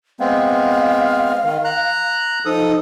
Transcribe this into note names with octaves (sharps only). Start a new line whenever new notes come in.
G#3 B3 C4 F5
D#3
A#5 F#6
F3 D#4 A4 D#6